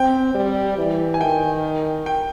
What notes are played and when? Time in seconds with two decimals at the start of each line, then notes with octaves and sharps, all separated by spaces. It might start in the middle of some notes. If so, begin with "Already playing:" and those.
Already playing: C4 G5
0.34 G3
0.77 E3
1.14 G#5
1.20 D#3 G5
2.06 G5